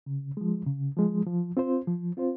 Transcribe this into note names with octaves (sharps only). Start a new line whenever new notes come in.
C#3
F3 G#3
C#3
F3 G#3
F3
C4 F4 C5
F3
C4 F4 C5